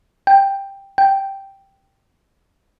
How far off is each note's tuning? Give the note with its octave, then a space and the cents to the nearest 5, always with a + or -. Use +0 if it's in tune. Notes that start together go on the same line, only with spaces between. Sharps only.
G5 +5
G5 -5